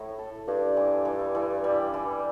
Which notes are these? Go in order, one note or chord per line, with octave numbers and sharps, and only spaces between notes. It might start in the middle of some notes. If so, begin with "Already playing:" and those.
Already playing: A2 E4
A4
G2 D4
E3
E3
E3
G3
E3